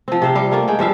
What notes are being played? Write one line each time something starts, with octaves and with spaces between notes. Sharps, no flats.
F3 C4
C3 C5 F5
G3 F5
A3 A#3 F4
G#3 G5
G2 F3 E5 F5